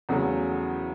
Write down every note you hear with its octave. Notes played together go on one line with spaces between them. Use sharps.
E2 C#3 F#3 A3